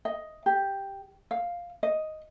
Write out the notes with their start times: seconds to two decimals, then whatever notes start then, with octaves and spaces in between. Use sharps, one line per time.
0.05 D#5
0.46 G4
1.31 F5
1.83 D#5